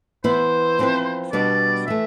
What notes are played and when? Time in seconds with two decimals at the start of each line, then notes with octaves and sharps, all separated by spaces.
0.24 E3 B3 E4 B4 C5
0.79 F3 C4 E4 B4
1.32 B2 G3 B3 D4 D5
1.86 E3 A3 E5